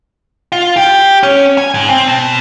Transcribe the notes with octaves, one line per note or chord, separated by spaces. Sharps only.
F4
G4
C#4
G#5
G#2
C4
B2